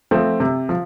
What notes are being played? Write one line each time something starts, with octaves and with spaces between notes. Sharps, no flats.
F3 A3 C4
C3
F3